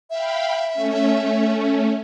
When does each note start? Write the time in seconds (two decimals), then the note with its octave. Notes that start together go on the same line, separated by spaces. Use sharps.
0.10 E5 F5 G5 B5
0.73 A3 C#4